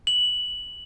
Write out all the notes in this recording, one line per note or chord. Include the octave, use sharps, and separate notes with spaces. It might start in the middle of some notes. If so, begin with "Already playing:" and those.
F#7